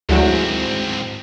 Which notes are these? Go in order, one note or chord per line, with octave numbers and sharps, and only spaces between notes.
D2 G#2 F#3 G#3 C4 E4 F#4